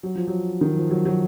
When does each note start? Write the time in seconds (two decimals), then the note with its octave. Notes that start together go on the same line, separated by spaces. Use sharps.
0.03 F#3
0.16 F3
0.27 F#3
0.61 D#3
0.76 F3
0.91 F#3
1.05 F#3